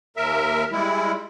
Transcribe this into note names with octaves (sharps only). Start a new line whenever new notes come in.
D#2 A#4 E5
G3 G#3 E4